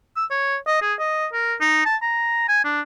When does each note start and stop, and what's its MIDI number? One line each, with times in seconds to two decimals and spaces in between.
0.16 0.25 88
0.31 0.56 73
0.67 0.80 75
0.82 0.94 68
0.99 1.27 75
1.33 1.54 70
1.61 1.84 63
1.86 1.96 81
2.02 2.47 82
2.49 2.62 80
2.65 2.81 62